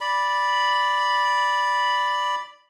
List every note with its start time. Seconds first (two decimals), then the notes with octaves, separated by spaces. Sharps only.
0.01 D5 B5